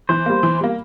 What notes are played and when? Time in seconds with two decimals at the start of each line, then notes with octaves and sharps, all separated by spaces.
0.09 E3 C5
0.26 G3 A#3
0.43 E3
0.61 G3 A#3